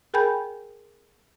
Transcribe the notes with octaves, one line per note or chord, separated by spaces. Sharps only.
G#4 A#4 G5 G#5 B5 G6